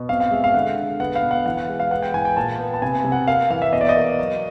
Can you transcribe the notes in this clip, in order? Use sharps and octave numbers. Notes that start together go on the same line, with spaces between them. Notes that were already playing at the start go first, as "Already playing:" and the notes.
Already playing: B2
C4 F5
F5
G#3 E5
F5
D3 F#5
D3
B3 F#5
F5
B2
F#5
E3 F#5
F#5
G#3
F5
B3 F#5
G5
E3 G#5
G5
A#2 A5
B3
A5
C3 G#5
C3
F#5
A#3 F5
E3 F5
E5
B2 D#5
D5
D#5
A#3
F#3